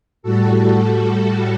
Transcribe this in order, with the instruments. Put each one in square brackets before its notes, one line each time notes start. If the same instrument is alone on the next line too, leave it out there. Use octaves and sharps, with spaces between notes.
[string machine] A2 G3 F#4 A4
F#4